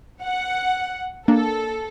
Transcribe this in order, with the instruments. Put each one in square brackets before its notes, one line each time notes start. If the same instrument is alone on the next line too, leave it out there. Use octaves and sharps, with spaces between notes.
[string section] F#5
[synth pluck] A#3 D4 [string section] A4